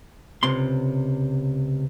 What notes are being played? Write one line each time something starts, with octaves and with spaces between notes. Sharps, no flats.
C#2 C3 C6